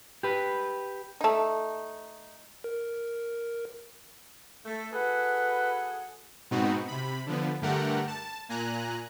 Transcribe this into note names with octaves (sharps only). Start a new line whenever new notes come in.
G4 B4
A3 D#4
A#4
A3 A4
F#4 G#4 A4 B4
G#2 B2 B3 C4 D#4 F#4
C3 B5
D3 F3 B3
G2 D3 A3 G4 A#4 F#5
A5
A#2 G#5 A#5 F#6